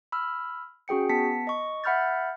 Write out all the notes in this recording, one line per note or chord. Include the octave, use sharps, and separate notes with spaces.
B5 E6 F6
C#4 F#4 G#4 G5 C#7
B3 A5 B6 C#7
D#5 C#6
E5 F#5 B5 F6 G6 A6